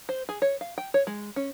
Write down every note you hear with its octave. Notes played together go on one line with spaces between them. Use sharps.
C5
G#4
C#5
F5
G5
C#5
G#3
C#4